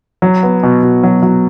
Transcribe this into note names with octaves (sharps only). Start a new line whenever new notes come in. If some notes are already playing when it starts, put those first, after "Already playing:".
F#3
B3
B2
B2
F#3
F#3